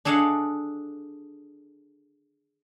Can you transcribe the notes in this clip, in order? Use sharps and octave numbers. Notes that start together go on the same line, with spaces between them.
D4 G#4 A4 D#5 F5 F#5